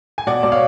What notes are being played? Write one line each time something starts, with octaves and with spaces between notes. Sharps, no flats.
G#5
B2 D5 F#5
B2 D5
C#5 F5